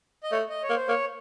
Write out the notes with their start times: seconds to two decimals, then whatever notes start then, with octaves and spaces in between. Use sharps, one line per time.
0.23 D#5
0.32 A3 C#5
0.50 D#5
0.63 C#5
0.69 A#3
0.75 C5
0.88 A#3 C#5